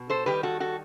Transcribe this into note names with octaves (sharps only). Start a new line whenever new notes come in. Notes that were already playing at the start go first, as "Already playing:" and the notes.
Already playing: B2
A4 C5
D#3 G3 G4 B4
F#4 A4
F#4 A4